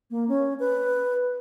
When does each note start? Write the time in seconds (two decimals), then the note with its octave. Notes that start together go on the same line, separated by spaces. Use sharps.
0.11 A#3
0.29 C#4
0.60 B4